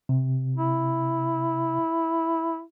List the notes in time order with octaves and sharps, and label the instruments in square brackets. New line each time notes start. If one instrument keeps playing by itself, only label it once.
[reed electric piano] C3
[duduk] E4